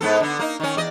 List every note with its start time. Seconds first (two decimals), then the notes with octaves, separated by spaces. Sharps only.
0.01 G#2 B3 A4
0.20 D3 B3
0.39 A#3 D#4
0.60 D#3 C#4
0.76 E2 D5 D#5